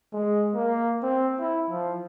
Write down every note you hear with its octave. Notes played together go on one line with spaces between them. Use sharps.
G#3
A#3
C4
E4
F3